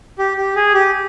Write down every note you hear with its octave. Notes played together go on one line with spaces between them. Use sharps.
G4
G4
G#4
G4